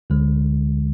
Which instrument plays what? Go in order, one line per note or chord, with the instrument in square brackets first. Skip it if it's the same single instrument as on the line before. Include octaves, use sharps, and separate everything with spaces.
[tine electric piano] D2 D3 G#3